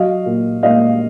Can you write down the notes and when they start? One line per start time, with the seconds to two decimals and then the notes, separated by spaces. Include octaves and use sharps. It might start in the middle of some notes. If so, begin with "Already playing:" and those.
Already playing: F#3 D#5 F5
0.26 A#2
0.63 A#2 D#5 F5